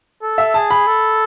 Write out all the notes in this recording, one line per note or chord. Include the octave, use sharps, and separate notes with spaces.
A4
E5
G#4 A5
B5
A4